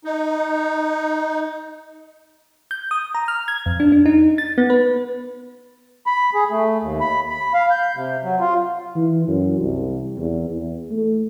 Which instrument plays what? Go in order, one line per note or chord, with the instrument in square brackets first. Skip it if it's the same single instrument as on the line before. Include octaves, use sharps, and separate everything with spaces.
[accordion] D#4
[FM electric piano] G6
D#6
A#5
F6
G#6
F2
D4
D4
D#4
A6
B3
B4
[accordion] B5
G#4
A3
D#2
B5
B5
F5
G6
C3
F#3
F4
[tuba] E3
F#2
C2
E2
E2
A3